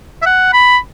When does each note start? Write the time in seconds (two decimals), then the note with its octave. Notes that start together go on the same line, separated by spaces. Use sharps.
0.22 E5
0.26 F#5
0.53 B5